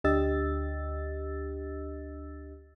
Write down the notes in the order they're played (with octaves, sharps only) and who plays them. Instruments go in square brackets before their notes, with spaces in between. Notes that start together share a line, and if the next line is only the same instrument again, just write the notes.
[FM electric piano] D2 D4 G4 D#5 E6 A6